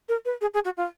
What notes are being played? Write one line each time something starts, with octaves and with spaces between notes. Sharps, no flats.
A#4
B4
G#4
G#4
F#4
F4